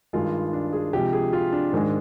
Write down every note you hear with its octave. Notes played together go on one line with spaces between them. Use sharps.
G2 D#3 G#3 F4
D4
G#4
C3 F3 G#3 G4
G#4
F4
D4
G#2 D#3 G#3